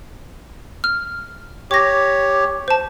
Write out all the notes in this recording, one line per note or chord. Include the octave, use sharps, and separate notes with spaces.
F6
G4 C#5 D6 A#6
C5 A5